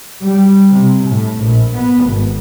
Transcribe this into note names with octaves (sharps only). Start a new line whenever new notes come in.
G3
C3
A2
A#1
B3
G#1